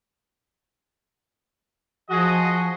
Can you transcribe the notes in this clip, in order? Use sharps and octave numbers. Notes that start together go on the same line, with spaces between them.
F3 F#4 G#4 D#5